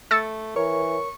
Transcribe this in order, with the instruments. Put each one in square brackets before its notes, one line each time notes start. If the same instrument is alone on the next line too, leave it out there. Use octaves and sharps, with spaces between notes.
[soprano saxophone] A3 [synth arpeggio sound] E6 A6 C#7
[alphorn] E3 [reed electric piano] A#4 C#5 [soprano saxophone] C#6